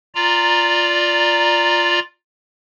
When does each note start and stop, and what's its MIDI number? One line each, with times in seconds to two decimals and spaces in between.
0.15 1.99 65
0.15 1.99 74
0.15 1.99 82